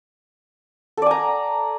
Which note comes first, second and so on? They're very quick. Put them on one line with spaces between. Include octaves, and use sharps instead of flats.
A4 D5 G#5 A#5